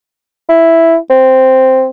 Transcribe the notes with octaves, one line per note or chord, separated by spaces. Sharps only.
E4
C4